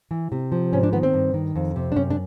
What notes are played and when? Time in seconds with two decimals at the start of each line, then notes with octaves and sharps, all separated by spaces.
0.11 E3
0.32 C3
0.52 F3
0.72 G#2 C#4
0.83 D4
0.92 D#3 B3
1.03 C4
1.13 G2
1.34 D#3
1.56 F2
1.76 C3
1.92 D4
1.96 F#2 C#4
2.10 D4